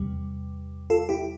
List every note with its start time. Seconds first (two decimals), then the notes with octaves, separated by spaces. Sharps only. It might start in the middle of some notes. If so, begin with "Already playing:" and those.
Already playing: E2 C3 G3
0.90 F4 A4
1.09 E4 G4